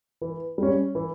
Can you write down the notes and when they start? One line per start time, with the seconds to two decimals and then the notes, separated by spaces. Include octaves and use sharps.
0.21 E3
0.58 G3 C#4
0.95 E3